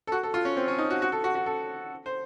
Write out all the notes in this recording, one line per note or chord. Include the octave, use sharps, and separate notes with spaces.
A4
F#4
A4
F4
C#4
C4
C#4
D#4
F#4
F#4
A4
F#4
F#4
A4
C5